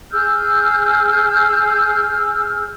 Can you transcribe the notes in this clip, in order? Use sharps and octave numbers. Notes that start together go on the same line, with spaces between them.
G#4 E6 F6 G6